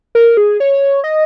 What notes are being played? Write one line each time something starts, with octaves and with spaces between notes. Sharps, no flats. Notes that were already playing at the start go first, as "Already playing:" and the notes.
A#4
G#4
C#5
D#5